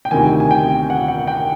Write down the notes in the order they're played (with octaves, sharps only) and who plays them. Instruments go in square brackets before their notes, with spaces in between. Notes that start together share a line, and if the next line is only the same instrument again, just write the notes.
[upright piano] G5
D2 C3 D#3 G#5
G#5
G5
F#5
F#5
G5